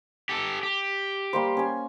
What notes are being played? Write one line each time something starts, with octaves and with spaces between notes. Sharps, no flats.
G4 A4
G4
G3 A#3 C5
C#4 G#5